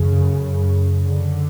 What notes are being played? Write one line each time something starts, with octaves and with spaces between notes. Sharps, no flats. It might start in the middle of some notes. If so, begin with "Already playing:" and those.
Already playing: F#2 C#3
D3